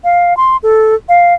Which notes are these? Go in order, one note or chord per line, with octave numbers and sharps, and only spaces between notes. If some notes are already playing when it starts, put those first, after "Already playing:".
F5
C6
A4
F5